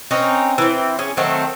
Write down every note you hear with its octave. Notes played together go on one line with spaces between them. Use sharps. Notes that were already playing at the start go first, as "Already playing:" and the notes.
C4 C#4 D#4 B4
E3 C4
C#4 G#4
D#3 F#3 A3 C4